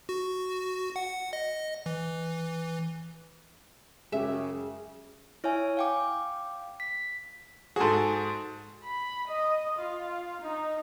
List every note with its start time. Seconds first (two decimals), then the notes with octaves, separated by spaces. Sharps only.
0.09 F#4
0.96 F#5
1.33 D#5
1.86 E3
4.12 F#2 C#3 G#3 C#4 G4 G#4 E5
5.44 E4 C#5 E5 G#5
5.77 F5 G5 D6
6.80 B6
7.76 G#2 F#4 G#4 A4
8.84 B5
9.28 D#5
9.79 F4
10.41 D#4